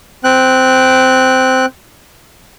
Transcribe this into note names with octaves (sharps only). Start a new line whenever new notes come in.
C4 G5 F#6